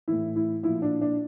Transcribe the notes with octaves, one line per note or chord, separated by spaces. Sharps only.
A2 E3 E4
E4
A#2 F3 E4
D4
D4